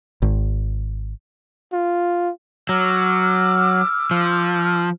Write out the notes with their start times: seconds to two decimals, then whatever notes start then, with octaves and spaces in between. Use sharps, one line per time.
0.22 G#1
1.73 F4
2.69 F#3 D6 E6 F6
4.11 F3